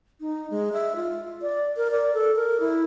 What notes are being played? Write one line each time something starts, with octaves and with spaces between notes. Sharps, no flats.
D#4
G#3
E5
F4
D5
A#4
D5
A4
A#4
E4